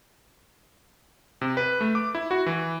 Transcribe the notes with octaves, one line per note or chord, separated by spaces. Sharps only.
C3
B4
A3
D6
E4
F#4
E3